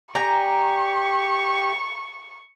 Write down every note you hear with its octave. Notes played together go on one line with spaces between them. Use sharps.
G4 D5 G5 G#5 A#5 C#6